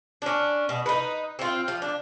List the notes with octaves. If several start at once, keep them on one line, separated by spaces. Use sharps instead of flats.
C#4 D4
B2
D#4 B4
C4 F4
F3
D4